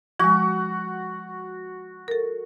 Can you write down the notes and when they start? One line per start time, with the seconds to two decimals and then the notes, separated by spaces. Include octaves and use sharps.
0.20 F3 G#3 F#4
2.08 A4 A#4